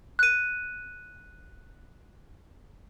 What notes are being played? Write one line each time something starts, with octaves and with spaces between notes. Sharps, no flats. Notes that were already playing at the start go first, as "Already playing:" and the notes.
F#6 D#7